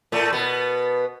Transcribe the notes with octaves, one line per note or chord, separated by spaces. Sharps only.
A2 A3
B2 B3